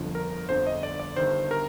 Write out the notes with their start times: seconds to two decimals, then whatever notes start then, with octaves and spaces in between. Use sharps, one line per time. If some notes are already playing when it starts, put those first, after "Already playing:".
Already playing: G1 F2 D3 F3
0.15 A#4
0.49 G1 F2 D3 F3 C5
0.67 D#5
0.83 D5
1.00 D5
1.16 G1 G2 D#3 C5
1.51 A#4